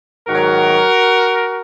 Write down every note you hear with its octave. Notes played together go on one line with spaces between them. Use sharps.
G#2 D#3 F#3 F#4 A#4